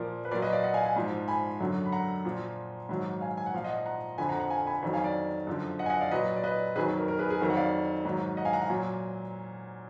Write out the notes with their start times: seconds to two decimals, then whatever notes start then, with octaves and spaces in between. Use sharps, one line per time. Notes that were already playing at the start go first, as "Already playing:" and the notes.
Already playing: A#2 F3 A#4 D5
0.25 B4
0.31 A#2 A#4 D5
0.34 F#3
0.42 B4 D#5
0.53 D5 F5
0.63 D#5 F#5
0.74 F5 G#5
0.85 F5 G#5
0.96 G#2 F3
1.28 G#5 B5
1.60 F#2 D3 F#3
1.85 B5
1.92 F#5 A#5
2.25 A#2 F3
2.89 G#2 D#3 F#3
3.21 F5 G#5
3.37 G#5
3.46 F#5
3.54 A#2 F3 F5
3.64 D#5 F#5
3.86 F#5 A#5
4.18 F2 D3 F3 G#5 B5
4.29 F#5 A#5
4.40 F#5 A#5
4.50 F5 G#5
4.66 G#5 B5
4.83 F2 D#3 F#3
4.93 F5 G#5
5.04 D5 F5
5.47 F#2 D3 F3
5.79 D#5 F#5
5.86 G#5
5.90 D#5 F#5
6.01 D5 F5
6.11 A#2 F#3 B4 D#5
6.36 D5
6.44 B4 D#5
6.76 F2 D#3 F#3 G#4 B4
6.97 A#4
7.08 A#4
7.19 G#4 B4
7.30 G#4
7.41 F2 D#3 F#3 A#4
7.50 F#5
7.56 D5 F5
8.05 G#2 D#3 F#3
8.37 D#5 F#5
8.45 F5 G#5
8.53 F#5 A#5
8.61 F5 G#5
8.69 A#2 F#3